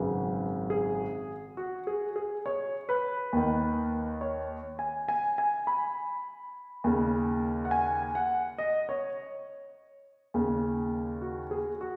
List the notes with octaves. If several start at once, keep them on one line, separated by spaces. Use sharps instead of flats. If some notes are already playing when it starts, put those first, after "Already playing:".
Already playing: G#1 F#2 C#3 B4
G#4
F#4
G#4
G#4
C#5
B4
D#2 D#3
C#5
G#5
G#5
G#5
B5
D#2 C#3
F#5
G#5
F#5
D#5
C#5
D#2 C#3
F#4
G#4
F#4